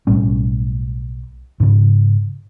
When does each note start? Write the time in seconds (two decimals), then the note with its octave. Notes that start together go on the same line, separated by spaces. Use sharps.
0.07 B1 A2 G3 C#4
1.60 G#2 C#3